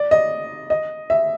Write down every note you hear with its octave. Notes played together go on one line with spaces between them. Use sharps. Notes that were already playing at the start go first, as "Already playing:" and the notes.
Already playing: D5
D#5
D#5
E5